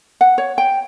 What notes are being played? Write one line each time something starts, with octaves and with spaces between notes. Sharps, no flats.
F#5
C#5
G5